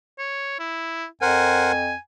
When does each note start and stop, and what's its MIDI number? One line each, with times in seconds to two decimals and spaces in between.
0.19 0.56 73
0.59 1.06 64
1.22 1.92 41
1.22 1.72 70
1.22 1.72 72
1.22 1.72 78
1.22 1.97 80